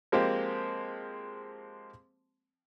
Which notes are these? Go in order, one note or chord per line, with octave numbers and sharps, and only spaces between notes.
F3 G#3 A#3 C4 G4